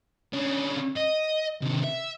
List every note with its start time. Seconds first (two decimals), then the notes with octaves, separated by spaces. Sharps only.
0.33 D3 C#4
0.97 D#5
1.61 C3 D#3
1.84 E5